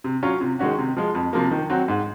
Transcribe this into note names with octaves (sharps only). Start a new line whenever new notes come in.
C3
F#3 C#4 F4
C3
D#3 G#3 C#4 F#4
C3
F3 G#3
F2
C3 F3 A#3
D#3
F#3 C4 F#4
G#2